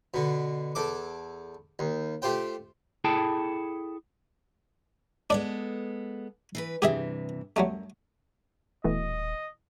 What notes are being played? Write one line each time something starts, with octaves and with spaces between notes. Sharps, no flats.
B2 D3
E2 A4 D6
D#2
A3 F4 G4 C5 G5
E4 G#4 A4 G5 A5
G#3 B3 D4 A4 D5
E3 A#4 B4
G2 C3 E3 G4 G#4 E5
F#2 F#3 G3 A3
D#1 B2 E3 A3 D#5